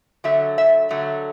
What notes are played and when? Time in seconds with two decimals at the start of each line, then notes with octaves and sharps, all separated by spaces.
0.24 D3 F#3 A3 E5
0.58 E5
0.90 D3 F#3 A3